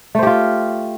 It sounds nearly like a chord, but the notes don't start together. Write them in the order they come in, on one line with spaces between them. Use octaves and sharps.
A3 C5 G4 F4